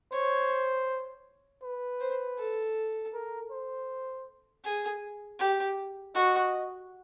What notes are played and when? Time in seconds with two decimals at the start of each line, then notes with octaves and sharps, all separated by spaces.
0.12 C5 C#5
1.63 B4
2.00 C5
2.39 A4
3.13 A#4
3.51 C5
4.64 G#4
5.40 G4
6.15 F#4 D#5